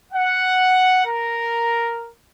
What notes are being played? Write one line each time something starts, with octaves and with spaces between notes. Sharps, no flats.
F#5
A#4